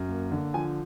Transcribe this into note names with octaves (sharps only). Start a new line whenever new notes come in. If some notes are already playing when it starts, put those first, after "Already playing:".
Already playing: F#2
A#3
D3
F3 G#5